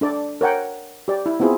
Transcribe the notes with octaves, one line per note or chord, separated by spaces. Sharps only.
D4 A4 D5
A#4 C#5 F#5 G5
G4 D5
E4
B3 C4 E4 F4 G#4